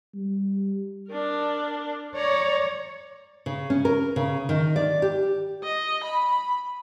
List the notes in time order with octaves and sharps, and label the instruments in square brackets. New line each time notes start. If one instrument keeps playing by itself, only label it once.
[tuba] G3
[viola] D4 A#4
[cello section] C#5 [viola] D5 A#5
[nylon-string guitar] C#3
C#4
A#4
C#3
D#3
D5
G4
[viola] D#5
B5